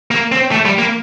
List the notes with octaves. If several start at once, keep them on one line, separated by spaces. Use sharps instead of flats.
A#3
C4
A3
G3
A#3